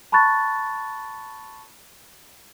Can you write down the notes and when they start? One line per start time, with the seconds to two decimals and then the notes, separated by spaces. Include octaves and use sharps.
0.12 A5 B5 C#6 F#6 A6